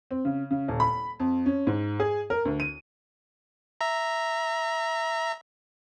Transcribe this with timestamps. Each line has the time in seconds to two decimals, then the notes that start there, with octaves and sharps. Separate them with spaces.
0.11 C4
0.25 C#3
0.51 C#3
0.68 D#1
0.80 B5
1.20 F2
1.46 C#4
1.67 G#2
2.00 G#4
2.30 A#4
2.45 D2
2.60 D#7
3.81 E5 A#5